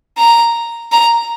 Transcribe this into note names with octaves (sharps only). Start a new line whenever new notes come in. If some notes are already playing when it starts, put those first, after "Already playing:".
A#5
A#5